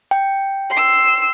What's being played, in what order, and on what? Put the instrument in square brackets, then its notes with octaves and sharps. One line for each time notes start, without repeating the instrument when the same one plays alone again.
[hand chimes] G5
[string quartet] C6 E6